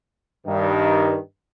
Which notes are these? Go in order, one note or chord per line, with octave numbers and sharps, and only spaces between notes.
G2 D#3